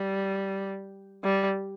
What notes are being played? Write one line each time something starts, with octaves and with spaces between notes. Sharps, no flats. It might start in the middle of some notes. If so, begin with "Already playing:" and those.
Already playing: G3
G3